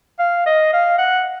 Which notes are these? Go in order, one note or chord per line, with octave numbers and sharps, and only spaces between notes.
F5
D#5
F5
F#5